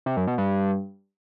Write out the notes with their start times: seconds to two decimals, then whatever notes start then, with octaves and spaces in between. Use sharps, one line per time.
0.06 C3
0.17 F#2
0.27 B2
0.38 G2